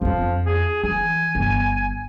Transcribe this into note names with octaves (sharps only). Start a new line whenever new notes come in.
F2 F3 F4
G#4
E3 G#5
G1